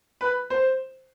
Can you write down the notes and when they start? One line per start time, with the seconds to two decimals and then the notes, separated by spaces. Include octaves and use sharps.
0.21 B4
0.50 C5